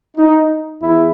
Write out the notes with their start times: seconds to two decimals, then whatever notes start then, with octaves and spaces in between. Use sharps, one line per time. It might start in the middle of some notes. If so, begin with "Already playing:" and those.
0.17 D#4
0.82 E2 E4